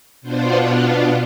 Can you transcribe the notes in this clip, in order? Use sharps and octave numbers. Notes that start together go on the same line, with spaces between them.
B2 B3 D4 F4 C5